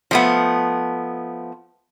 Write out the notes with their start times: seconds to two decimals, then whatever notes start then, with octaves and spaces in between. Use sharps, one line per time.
0.11 F3 A3 B3